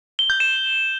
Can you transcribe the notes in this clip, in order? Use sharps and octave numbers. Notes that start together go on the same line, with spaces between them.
G7
G6
E7